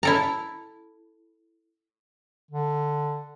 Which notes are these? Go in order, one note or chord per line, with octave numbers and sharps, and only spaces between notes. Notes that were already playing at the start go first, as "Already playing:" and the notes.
E4 A4 A#5
D3